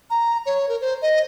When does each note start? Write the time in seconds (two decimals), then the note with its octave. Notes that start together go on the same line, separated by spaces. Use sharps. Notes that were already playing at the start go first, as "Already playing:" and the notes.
0.10 A#5
0.46 C#5
0.69 A#4
0.81 C5
1.02 D#5